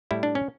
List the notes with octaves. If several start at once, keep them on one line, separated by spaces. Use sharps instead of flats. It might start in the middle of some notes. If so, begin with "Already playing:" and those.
A2 G3 E4
D4
C#4